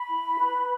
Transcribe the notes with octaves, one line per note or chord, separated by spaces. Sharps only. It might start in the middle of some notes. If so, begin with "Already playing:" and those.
Already playing: B5
E4
B4